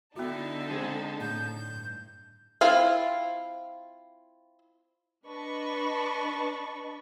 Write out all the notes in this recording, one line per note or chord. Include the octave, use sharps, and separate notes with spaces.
D3 B3 D#4 E4 F#4 A5
G#3 C4 G#4
A2 G6
G2
C4 E4 F4 C5 F5
D4 B4 D#5 A5 B5 C#6